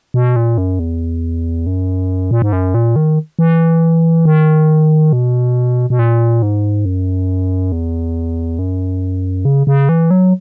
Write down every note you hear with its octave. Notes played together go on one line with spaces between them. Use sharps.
B2
A#2
F#2
E2
F#2
A#2
G#2
F#2
A#2
D#3
E3
D#3
B2
B2
A#2
G#2
F#2
E2
F#2
C#3
C#3
E3
F#3